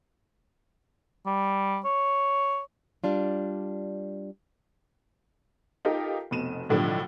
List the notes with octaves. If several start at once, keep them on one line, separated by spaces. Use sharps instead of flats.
G3
C#5
G3 D4 F4
D#4 F4 G4 A4 A#4 D#5
F1 B2 D#7 E7
B1 A2 D3 F3 G3